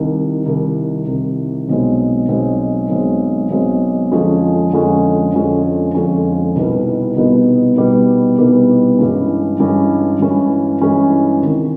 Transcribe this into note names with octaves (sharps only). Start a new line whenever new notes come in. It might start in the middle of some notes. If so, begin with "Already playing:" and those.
Already playing: C2 C3 D#3
C2 C3 D#3
C2 C3 D#3
B1 B2 G#3 C4
B1 B2 G#3 C4
B1 B2 G#3 C4
B1 B2 G#3 C4
F2 D3 F3 G#3 C#4
F2 D3 F3 G#3 C#4
F2 D3 F3 G#3 C#4
F2 D3 F3 G#3 C#4
C2 B2 G3 B3 D#4
C2 B2 G3 B3 D#4
C2 B2 G3 B3 D#4
C2 B2 G3 B3 D#4
G2 E3 G#3 C#4
G2 E3 G#3 C#4
G2 E3 G#3 C#4
G2 E3 G#3 C#4
C2 C3 D#3